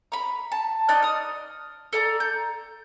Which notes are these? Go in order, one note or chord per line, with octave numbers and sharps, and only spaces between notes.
A#5 B5
A5
D#4 D5 D#5 F#6
D#6 F6
A4 D5 A#5
G6